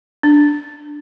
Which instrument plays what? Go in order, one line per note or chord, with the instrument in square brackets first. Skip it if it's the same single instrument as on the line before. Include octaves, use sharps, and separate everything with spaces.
[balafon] D4